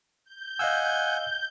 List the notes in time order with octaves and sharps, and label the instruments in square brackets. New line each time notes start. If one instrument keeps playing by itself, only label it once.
[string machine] G6
[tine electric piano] D#5 F5 E6 [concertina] F#5 G#5